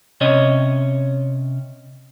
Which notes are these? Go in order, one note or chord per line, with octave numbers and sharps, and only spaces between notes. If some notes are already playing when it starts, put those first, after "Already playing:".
C3 C#4 C#5 D#5